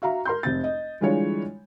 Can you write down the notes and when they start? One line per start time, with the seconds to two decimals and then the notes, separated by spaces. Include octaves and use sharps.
0.02 F#4 E5 F5 A#5
0.25 A#4 C6 G6
0.43 F1 C4 A6
0.64 D#5
1.01 D3 E3 G3 G#3 F4 C#5